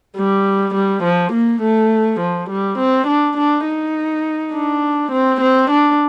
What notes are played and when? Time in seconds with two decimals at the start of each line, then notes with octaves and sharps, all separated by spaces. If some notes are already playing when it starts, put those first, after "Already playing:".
0.17 G3
0.75 G3
1.03 F3
1.33 A#3
1.62 A3
2.20 F3
2.50 G3
2.79 C4
3.07 D4
3.37 D4
3.66 D#4
4.53 D4
5.12 C4
5.42 C4
5.71 D4